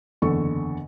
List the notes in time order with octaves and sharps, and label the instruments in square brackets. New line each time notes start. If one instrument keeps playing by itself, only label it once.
[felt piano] F#1 E2 D3 A4 C#6